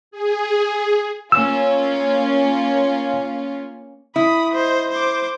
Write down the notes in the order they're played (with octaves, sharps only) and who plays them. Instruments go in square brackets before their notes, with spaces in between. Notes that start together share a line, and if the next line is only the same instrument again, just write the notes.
[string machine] G#4
[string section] A#3 C#4 F4 [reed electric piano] E6
[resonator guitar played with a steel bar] E4 [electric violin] B5 D#6
[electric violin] C5 D#5
C5 D6